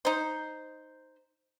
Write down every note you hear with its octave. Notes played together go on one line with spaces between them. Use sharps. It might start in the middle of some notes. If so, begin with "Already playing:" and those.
D#4 C5